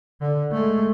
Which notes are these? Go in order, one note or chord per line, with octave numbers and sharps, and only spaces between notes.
D3
G#3 A3